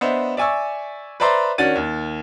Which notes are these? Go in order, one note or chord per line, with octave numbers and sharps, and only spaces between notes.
B3 D4 C5 D#5 E5
D5 E5 G#5 C#6 E6
B4 C5 D5 E5 A#5 C6
D#3 C#4 D4 F#4 A6 D#7
D#2